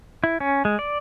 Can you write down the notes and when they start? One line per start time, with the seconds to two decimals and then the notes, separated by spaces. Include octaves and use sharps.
0.24 E4
0.40 C#4
0.65 G#3
0.79 D5